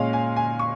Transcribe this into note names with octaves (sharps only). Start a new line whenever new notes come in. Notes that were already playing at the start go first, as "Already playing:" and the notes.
Already playing: A#2 G#3 C#4 F5
G#5
G#5
C#6